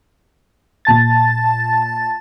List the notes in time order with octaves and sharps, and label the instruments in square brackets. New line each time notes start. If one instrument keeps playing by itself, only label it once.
[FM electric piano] A#2 A5 A6